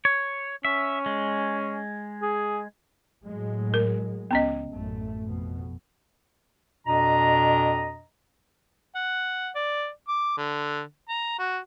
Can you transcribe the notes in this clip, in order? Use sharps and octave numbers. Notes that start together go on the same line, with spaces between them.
C#5
C#4 E5
G#3
G#4
A2 F#3 G#3
A#4
C#2 B3 C#4 D#5
A1 F#2 A3
F2 B2
F2 B2 D4 D#5 A#5
F#5
D5
D6
D3
A#5
F#4